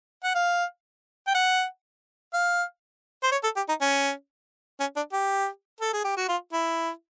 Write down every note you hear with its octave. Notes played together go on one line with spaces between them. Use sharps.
F#5
F5
G5
F#5
F5
C5
C#5
A4
G4
D#4
C#4
C#4
D4
G4
A4
G#4
G4
F#4
F4
E4